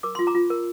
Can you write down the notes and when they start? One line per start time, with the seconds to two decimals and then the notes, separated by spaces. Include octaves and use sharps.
0.03 A#4 D6
0.15 F4 C6
0.27 A#5 D6
0.35 F4
0.50 A#4